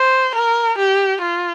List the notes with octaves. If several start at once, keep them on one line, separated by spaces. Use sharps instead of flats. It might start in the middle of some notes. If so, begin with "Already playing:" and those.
Already playing: C5
A#4
G4
F4